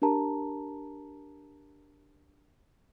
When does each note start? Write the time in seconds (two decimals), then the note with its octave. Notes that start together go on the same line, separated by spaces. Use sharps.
0.02 D4 G4 A#4 A5 A#5